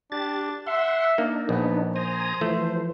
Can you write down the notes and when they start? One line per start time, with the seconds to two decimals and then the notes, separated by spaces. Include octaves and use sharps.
0.12 D4 G4 A6
0.67 E5 F#5 C6
1.18 A#3 D4 D#4
1.49 A#1 B3
1.96 C5 G#5 A#5 D#6
2.41 E3 F3 A3